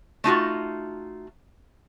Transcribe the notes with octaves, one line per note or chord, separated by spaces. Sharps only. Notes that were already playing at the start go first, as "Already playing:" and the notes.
A3 D#4 F4 F#4